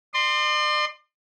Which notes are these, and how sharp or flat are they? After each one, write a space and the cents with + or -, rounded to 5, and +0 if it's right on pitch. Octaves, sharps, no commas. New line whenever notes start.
D5 +45 C6 +0